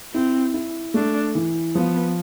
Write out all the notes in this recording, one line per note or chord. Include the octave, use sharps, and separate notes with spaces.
C4 E4
E4
A3 D4
E3
F3 B3